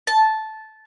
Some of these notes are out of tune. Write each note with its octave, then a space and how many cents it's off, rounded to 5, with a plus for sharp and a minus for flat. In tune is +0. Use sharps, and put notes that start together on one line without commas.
A5 -10